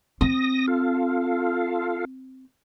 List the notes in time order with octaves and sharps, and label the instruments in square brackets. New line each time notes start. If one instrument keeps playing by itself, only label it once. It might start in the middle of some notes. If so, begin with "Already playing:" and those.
[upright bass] C4 [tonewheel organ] D#6 A#6
[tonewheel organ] F4 A4 F5